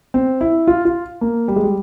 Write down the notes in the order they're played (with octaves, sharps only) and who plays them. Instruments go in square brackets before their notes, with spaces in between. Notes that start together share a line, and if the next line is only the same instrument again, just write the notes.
[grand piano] C4
E4
F4
F4
A#3
G3
G#3
G3